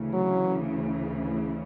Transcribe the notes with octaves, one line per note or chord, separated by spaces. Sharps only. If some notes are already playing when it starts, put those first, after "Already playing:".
Already playing: D2 C#3 E3
F#3